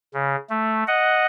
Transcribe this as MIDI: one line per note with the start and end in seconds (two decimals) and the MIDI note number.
0.14 0.36 49
0.50 0.84 57
0.88 1.26 75
0.88 1.26 78